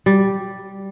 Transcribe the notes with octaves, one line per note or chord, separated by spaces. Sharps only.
G3